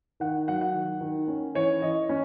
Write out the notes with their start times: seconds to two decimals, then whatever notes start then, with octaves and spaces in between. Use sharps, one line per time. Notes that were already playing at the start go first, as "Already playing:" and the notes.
0.20 D#3 F#5
0.48 F#3 F#5
0.61 F#5
0.74 D#3
1.01 D#3
1.27 C#4
1.55 E3 C#5
1.82 E3 D#5
2.09 C#4